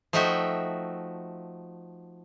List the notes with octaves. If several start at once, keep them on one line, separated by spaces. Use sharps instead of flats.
F3 A3 D#4 F#4 E5 G5